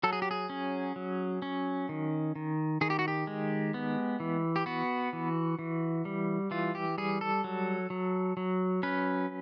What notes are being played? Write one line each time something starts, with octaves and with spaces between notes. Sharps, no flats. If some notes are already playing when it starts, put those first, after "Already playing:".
F#3 A4
G#4
G4
G#4
C#4
F#3
C#4
D#3
D#3
D#3 G#4
G4
F#4
G4
G#3
B3
E3
G4
B3 F#4
E3
E3
G3
E3 F4
G4
G3 G#4
A4
F#3
F#3
F#3
C#4 B4